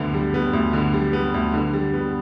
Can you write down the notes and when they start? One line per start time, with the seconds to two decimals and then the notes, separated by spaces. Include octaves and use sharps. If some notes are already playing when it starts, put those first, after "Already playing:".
Already playing: D2 D3 B3
0.14 G3
0.34 B3
0.53 D2
0.73 D3
0.93 G3
1.13 B3
1.34 D2
1.54 D3
1.73 G3
1.94 B3